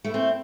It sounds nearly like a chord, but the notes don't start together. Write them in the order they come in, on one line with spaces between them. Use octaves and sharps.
A3 E4 C4